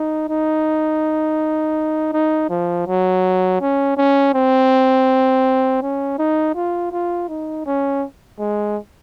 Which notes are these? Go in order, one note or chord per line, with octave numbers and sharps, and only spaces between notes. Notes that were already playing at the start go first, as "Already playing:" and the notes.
Already playing: D#4
D#4
D#4
F3
F#3
C#4
C#4
C4
C#4
D#4
F4
F4
D#4
C#4
G#3